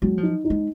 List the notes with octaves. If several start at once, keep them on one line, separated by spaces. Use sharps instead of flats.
F#3 G#3
F3
D#4
D#4
G#3